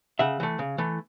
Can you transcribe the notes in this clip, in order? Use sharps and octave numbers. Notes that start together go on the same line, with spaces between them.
C#3 E5 F#5
E3 A3
C#3
E3 A3